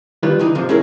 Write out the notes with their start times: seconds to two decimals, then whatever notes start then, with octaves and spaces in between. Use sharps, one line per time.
0.23 D#3 G3 F4 B4
0.39 D3 E3 D#4
0.55 G#2 C3 F3 G#3
0.69 C#4 E4 G#4 A#4